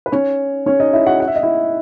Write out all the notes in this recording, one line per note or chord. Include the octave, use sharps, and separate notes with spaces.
B4
C#4 C#5
C#4 C#5
D#4 D#5
E4 E5
F#4 F#5
F#5
E5
D#5
E4 E5